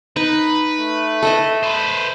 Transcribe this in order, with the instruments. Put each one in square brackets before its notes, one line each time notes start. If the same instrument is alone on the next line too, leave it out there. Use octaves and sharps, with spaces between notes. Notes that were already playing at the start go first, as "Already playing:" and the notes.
[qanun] D#4 [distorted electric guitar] B4
[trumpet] A3
[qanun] A4 D#5 E5
[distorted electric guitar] B4 C5